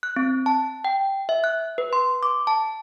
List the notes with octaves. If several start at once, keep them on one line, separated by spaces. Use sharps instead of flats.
F#6
C4
A5
G5
E5
F#6
B4
C6
D6
A5